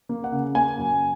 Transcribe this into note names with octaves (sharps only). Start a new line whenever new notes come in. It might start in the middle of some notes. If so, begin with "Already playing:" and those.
A#3
F#5
C#3
A#3 G#5
F#2